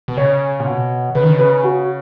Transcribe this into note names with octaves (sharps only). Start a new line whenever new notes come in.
B2
C#3 C#5
A#2
B2
C#3 B4
D#3
C#3
B4
F#4